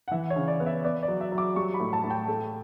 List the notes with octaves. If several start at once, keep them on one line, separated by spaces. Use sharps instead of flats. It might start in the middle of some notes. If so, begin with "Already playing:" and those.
F#5
E3 E5
C#5
C#3
D5
B3
E5
B3 D5
D5
F#3
E5
F#3
D6
G3 C#6
B5
A2
A5
A2
G5
A3